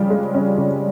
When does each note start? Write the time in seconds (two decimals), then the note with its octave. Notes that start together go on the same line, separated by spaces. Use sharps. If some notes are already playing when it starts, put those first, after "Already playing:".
Already playing: C#3 F3 G3 C#4
0.10 G#3
0.34 C#4
0.58 C#3